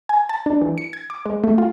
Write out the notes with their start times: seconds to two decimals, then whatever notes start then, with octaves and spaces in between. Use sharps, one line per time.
0.09 G#5
0.29 A5
0.46 D4
0.62 E3
0.78 C#7
0.93 G#6
1.10 D6
1.26 G#3
1.44 A3
1.58 F4